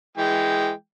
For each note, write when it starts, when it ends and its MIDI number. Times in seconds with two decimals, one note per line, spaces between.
0.18 0.71 52
0.18 0.71 56
0.18 0.71 79